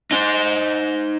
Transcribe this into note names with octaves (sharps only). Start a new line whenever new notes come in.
D#4 C5